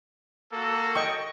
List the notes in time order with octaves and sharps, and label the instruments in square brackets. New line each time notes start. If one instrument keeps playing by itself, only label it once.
[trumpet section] A#3 F#4 A4
[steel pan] D#5 G5 C#6